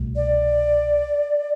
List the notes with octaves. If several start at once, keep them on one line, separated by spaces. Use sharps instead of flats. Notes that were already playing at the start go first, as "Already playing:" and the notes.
Already playing: C2 B2 A3
D5